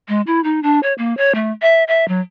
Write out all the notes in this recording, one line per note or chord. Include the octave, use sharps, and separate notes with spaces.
G#3
E4
D#4
D4
C#5
A#3
C#5
A3
E5
E5
F#3